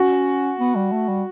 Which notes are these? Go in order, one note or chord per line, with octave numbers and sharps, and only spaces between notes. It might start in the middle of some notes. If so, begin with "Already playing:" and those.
Already playing: C#4 F#4
B3
G3
A3
G3